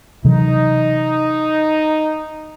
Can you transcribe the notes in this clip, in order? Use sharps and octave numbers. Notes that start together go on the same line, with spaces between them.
C3 E3 F#3 D#4